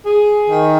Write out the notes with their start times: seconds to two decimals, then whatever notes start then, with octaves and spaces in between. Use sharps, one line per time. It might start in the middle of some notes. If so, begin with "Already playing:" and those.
0.05 G#4
0.50 D#3